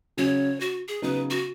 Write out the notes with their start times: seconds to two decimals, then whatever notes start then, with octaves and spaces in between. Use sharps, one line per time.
0.17 C#3 F#3 C#4 C#5
0.61 F#4
0.88 G#4
1.02 C#3 F#3 B3 D#4 B4
1.30 F#4